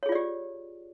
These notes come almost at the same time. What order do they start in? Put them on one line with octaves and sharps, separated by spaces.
C#5 G#4 F4 D5 G4